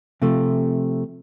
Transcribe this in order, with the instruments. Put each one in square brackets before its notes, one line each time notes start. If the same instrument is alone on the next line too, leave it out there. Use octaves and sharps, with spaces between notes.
[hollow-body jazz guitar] C3 F3 A3